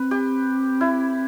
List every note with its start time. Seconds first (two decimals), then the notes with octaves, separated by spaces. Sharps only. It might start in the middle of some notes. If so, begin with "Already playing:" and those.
Already playing: C4 B4
0.11 G4
0.81 E4